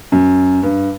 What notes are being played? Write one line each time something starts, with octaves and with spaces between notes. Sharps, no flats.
F#2
G2